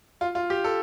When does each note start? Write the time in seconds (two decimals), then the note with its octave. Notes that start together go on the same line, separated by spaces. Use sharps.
0.21 F4
0.35 F4
0.50 G4
0.64 A4